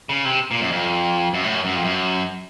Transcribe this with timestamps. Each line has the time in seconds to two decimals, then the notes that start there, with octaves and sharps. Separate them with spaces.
0.09 C#3
0.25 C3
0.51 A#2
0.61 F#2
0.72 F2
1.34 F#2
1.44 A2
1.55 F#2
1.65 F#2
1.75 F2
1.85 F#2